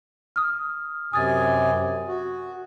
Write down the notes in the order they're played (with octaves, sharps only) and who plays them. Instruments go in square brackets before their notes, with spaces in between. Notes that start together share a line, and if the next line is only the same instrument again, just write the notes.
[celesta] D#6 F6
[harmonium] F#2 C3 G#5 [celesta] D#6 A6
[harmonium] F#4